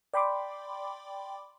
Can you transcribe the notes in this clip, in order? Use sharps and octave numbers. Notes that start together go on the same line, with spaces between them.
D5 G5 B5 C6 D6